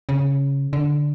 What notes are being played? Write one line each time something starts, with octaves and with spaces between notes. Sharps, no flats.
C#3
D3